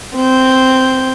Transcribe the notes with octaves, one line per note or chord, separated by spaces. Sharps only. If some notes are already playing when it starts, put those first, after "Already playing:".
C4 G6